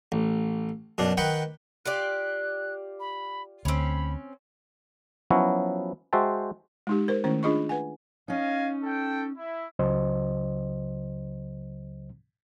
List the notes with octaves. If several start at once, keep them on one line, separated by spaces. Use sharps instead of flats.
A1
F#2 B2 D4
D#3 B4 F#5 G5
F4 G4 D5 F#6
B5
D2 C4 C#4 B5
F3 F#3 B3 C#4 E4 F#4
G#3 F#4 C5 E5 G5 A5
G#3 D#4 G4
A#4 C5
D#3 A3 C#4 E4 C5
D4 F4 G#4 D#5 B5 C#6
B4 F#5 G#5
C#4 D#4 D#5 F5 G#5
A4 G5
E4
C#2 C#3 F#3 C5 D#5